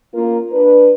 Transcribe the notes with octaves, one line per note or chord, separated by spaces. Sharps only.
A#3 C#4 F4 A#4
D4 B4